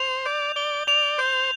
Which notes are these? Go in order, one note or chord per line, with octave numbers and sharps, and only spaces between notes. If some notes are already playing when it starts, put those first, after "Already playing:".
Already playing: C5 F7
D5 G6
D5 G7
D5 F7
C5 G6